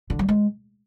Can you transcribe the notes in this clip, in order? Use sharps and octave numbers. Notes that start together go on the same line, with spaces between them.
D3
F#3
G#3